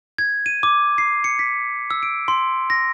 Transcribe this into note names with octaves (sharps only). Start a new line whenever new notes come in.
G#6
D#7
D6
C7
C#7
B6
E6
D7
C6
A#6